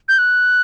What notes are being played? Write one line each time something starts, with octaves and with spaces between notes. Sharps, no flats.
G6
F#6